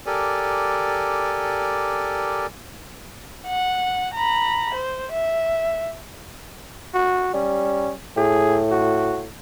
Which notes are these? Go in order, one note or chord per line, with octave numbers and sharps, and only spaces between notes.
G4 A4 A#4 D5 G#5
F#5
A#5 B5
C5
E5
F#4
G3 C#4
A2 G#4
F#4